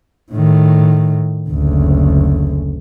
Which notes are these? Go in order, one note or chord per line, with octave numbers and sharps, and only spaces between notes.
A2 D#3
F#1 D2